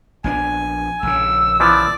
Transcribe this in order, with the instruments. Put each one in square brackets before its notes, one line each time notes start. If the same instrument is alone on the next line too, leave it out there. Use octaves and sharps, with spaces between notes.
[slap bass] A#1 B3 D4 [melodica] G#5
[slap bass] A#1 C#3 [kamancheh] E6
[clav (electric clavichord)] E3 F3 B3 [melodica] D5 D6